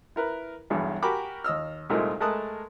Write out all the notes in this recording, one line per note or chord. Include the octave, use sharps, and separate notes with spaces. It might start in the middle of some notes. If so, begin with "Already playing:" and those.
E4 A#4 B4
B1 E2 G2 G#4
F#4 G4 A#4 G#5 B5 D6
D#2 D#5 E6 F6
C2 A#2 G#3 A3 D#4 A#4
G#3 A3 A#4 A5 D#6 F#6